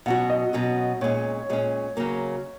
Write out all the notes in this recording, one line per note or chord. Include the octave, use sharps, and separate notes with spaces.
B2 F#3 C#4 F#4 F#5
D#5
B2 F#3 C#4 F#4
A#2 G#3 C#4 C#5
A#2 G#3 C#4
C#3 F#3 A#3